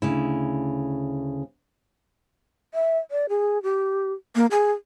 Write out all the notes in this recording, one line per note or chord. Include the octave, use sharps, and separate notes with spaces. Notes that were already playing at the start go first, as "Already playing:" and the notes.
D2 C#3 E4
E5
D5
G#4
G4
A#3
G#4